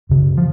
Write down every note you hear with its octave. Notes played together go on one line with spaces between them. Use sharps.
F#2 C#3
F3